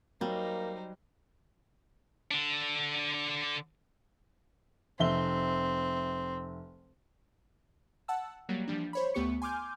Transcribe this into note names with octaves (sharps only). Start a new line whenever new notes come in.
F#3 G3 A#3 D#4 C5
D3 D4
F1 C4 E5 G7
F#5 A5 E6
F#3 G3 A#3
E3 F3 G3 D4
C5 C#5 B5
D2 A3 B3 G4 C#6 C#7
G#5 C6 D6 F6 G6